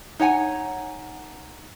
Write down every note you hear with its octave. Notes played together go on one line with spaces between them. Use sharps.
D#4 C#5 F#5 G#5